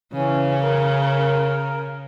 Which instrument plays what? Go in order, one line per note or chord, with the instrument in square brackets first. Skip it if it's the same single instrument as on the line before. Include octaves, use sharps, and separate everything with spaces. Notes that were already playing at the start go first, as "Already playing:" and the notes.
[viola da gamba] C#3 [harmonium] E3 C#4
[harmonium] A#4